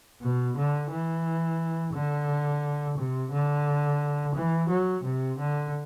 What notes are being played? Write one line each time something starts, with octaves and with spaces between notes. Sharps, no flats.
B2
D3
E3
D3
C3
D3
E3
F#3
C3
D3